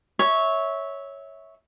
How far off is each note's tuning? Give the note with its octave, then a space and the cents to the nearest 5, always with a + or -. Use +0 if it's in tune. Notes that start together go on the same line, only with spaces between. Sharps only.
C#5 +0 E5 -20